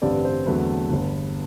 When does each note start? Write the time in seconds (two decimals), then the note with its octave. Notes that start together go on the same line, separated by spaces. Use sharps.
0.02 A1 G2 D3 G3 C4 B4 D5
0.24 C5
0.46 E2 D3 F#3 A3 C4 B4
0.90 G1 G2 D3